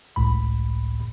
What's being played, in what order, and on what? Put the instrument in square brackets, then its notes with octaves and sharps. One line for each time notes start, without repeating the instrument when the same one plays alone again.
[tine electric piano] G#1 C#2 A2 B5